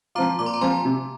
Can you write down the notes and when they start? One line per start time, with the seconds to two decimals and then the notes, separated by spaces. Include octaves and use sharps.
0.15 F3 C4 F4 A#5 D6
0.39 A#2 D6
0.46 C6
0.54 A#5
0.61 F3 C4 F4 G#5 C6
0.85 C3